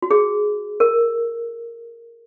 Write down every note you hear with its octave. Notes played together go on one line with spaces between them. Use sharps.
F#4
G#4
A#4